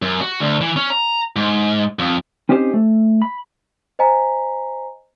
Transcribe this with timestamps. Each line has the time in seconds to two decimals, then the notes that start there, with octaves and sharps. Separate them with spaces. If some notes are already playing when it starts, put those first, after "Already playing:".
0.02 F#2
0.21 F#4
0.40 D2
0.61 E3
0.76 C#4
0.90 A#5
1.36 G#2
1.99 F2
2.49 C4 C#4 D#4 G4 A4 C5
2.74 A3
3.22 B5
3.99 C5 D#5 G#5 A#5 B6